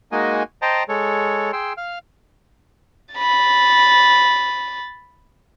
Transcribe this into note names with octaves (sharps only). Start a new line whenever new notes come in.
G#3 A#3 D#4 F#4 D#5 G#5
C5 D#5 G5 A5 A#5
G#3 A4 C#5
G#4 G5 C6 E6
F5 F6
B5 A6